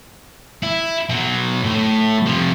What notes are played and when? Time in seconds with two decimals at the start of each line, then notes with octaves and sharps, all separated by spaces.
0.63 E4
1.09 B2 F#3
1.64 A2
2.26 C3 F3